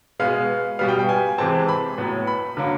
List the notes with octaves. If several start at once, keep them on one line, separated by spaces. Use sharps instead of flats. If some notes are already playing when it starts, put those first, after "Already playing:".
B2 G#3 B3 F5
B2 G3 B3 F5
G5
G5
G#5
C3 E3 G#3 C4 A5
B5
A2 F#3 B3
B5
D3 F#3 A#3